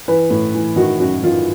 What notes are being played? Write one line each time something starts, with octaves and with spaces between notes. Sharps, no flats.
E3 B4
A2
E3
D#3 F#4
F#2 F#4
D#3 F4